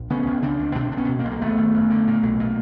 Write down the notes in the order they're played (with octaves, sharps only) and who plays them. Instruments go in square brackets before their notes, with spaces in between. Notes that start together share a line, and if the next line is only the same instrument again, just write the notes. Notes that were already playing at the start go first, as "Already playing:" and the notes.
Already playing: [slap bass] A#1
C#3 B3 C#4
C#2
C#3 C4 D4
C#2
B2 C4 D4
B1 D4
B3 C#4
B2
A#3 C4
B1
A#3
G#1 A3 B3
G#1
F#2
D3
A#2
B1
A#2